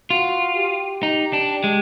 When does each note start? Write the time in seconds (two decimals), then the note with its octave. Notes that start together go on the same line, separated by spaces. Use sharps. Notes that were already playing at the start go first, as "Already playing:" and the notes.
0.10 F4 F#4
0.56 G4
1.03 D#4
1.33 D4
1.64 G#3